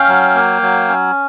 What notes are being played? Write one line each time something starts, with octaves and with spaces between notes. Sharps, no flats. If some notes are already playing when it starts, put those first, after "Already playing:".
Already playing: C#4 F5 G5
F#3
A#3
F#3
C#4